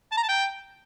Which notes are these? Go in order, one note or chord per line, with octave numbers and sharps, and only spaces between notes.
A5
A#5
A5
G5